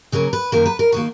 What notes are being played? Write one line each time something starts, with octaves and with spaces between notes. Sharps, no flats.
C#3 F#3 A#3 C#4 A#4
B4
F#2 D#3 A#3 A#4
B4
A#4
D#3 A#3 F#4